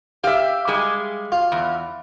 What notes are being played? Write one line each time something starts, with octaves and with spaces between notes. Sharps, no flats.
G4 E5 F5
G3 G#3
F4
E2